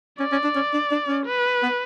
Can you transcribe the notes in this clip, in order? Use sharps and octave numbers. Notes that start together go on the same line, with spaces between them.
C#4 D5
C#4
D4
C#4
D4
D4
C#4
B4
B3